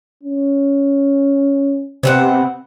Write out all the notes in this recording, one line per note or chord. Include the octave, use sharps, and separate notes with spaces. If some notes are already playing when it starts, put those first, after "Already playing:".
C#4
C3 B3 C4 F#5